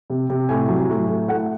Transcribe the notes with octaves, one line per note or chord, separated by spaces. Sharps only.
C3
C3
A2 G#5
F#3
A2
A2
A3 F#5